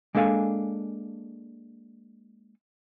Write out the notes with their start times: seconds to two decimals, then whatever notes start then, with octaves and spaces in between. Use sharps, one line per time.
0.15 G#3 A#3 D4 A4 F5 G#5